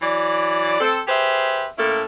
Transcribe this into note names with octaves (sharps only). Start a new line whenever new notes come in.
E3 F#3 D5
C4 A4
G4 G#4 B4 C5 E5
A2 A#3 C#4 E4 A4